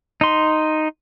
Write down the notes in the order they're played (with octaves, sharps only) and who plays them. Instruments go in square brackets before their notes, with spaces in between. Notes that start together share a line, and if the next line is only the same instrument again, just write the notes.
[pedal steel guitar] D#4 C6